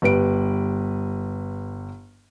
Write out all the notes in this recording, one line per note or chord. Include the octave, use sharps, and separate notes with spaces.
G1 G3 B4 D7